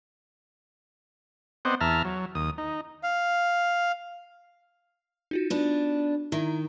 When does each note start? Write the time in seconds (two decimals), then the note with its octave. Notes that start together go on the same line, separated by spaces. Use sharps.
1.65 B3 C4 C5 D5 D#5 F#5
1.81 E2 E5 A5 A#5 F6
2.05 F#3
2.35 D#2 D#6
2.58 D#4
3.03 F5
5.31 D#4 F4 F#4
5.50 B3 D4
6.32 D#3 E4 E5 A#5